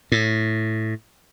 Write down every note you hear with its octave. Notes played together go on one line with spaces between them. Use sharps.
A2